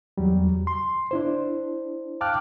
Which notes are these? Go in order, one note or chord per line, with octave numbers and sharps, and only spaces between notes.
E2 F#3 G3
C6
D4 E4 C5
F5 G5 A5 D6 F6 F#6